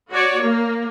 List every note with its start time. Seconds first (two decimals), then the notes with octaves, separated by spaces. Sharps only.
0.11 F#4 C#5 D5
0.41 A#3